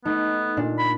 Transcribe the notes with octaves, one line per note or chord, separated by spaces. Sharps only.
A3 B3 D#4
A#2 D4
B5